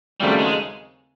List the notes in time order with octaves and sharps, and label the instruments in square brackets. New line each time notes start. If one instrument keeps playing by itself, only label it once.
[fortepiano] D#2 C#3 F#3 A3 C4 [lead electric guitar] G3
[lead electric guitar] G#3